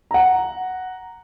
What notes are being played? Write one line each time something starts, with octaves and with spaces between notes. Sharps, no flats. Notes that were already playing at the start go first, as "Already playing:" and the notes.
F#5 A#5